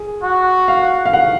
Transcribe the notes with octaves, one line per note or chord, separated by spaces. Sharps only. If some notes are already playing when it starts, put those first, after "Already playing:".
Already playing: G#4
F#4
F5
F5
F#5